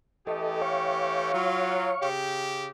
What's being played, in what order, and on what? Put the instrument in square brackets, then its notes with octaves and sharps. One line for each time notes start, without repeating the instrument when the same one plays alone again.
[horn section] E3 A3 G4 [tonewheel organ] A4 D#5
[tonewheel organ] C#5 F5 C#6
[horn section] F#3 F4
C#3 G4